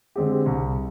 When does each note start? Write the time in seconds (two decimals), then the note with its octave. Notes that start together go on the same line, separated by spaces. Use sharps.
0.16 D3 G#3 C4 G4
0.46 C2